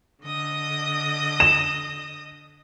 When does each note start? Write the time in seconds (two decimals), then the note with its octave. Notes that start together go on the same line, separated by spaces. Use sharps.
0.24 D3 D#5 D#6
1.40 E7